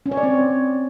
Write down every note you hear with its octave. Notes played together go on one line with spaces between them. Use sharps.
C#4
C#5
D5
C4